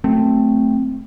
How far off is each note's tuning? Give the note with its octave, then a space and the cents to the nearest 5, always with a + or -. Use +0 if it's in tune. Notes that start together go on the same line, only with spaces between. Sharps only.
F#3 +0 A3 +0 C4 +0